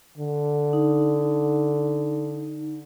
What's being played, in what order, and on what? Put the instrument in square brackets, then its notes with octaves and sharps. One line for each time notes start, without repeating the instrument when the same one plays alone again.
[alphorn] D3
[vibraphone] D#4